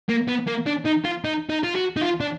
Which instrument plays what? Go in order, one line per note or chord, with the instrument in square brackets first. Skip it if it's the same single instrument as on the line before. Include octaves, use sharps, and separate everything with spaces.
[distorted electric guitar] A#3
B3
A#3
D4
D#4
F4
D#4
D#4
F4
F#4
D#4
F4
D4